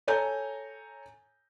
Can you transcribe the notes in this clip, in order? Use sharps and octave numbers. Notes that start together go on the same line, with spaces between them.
A4 C#5 G#5 A#5 G6